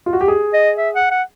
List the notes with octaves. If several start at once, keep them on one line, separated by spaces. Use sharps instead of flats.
F4
F#4
G4
G#4
D#5
E5
F#5
F#5